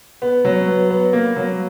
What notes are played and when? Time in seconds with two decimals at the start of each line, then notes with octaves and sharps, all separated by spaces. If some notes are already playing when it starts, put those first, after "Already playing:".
0.22 B3
0.45 F#3
0.68 B3
0.90 B3
1.13 A#3
1.36 F#3